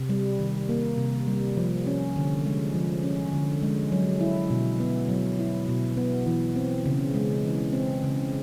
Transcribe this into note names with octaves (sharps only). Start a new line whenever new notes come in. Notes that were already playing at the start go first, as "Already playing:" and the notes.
Already playing: C3
G3
D#3
A#3
C3
G3
F3
C#4
D3
G#3
F3
C#4
D3
G#3
F#3
E4
B2
B3
F#3
E4
B2
B3
E3
C4
C#3
G#3
E3
C4
C#3